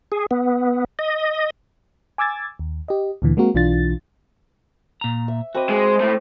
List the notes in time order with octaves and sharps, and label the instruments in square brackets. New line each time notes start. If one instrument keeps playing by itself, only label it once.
[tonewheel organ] G#4
B3
D#5
[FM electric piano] G#5 D6 E6 G#6 A6
D#2
G4 D#5
D2 A#2 D3 E3
G#3 A#3 C4 F#4 A#4
B1 E3 D4 F4 A6
[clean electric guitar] A#2 A#5
[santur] E5
[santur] C4 B5 D6 [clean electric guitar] F#4 D#5
[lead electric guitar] G#3
A2 A3